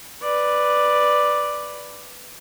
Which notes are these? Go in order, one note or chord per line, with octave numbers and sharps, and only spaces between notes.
B4 D5